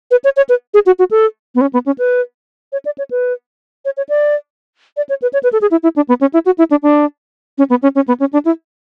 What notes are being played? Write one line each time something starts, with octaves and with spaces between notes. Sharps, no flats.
B4
C#5
C#5
B4
G#4
F#4
F#4
A4
B3
C#4
B3
C#4
B4
C#5
D5
C#5
B4
C#5
C#5
D5
D5
C#5
B4
C#5
B4
A4
G#4
E4
E4
D4
B3
C#4
E4
F#4
E4
D4
D4
C#4
B3
C#4
C#4
B3
C#4
D4
E4